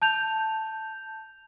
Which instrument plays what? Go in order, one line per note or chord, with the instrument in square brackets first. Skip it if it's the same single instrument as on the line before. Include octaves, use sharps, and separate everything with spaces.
[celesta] A5 G6 F7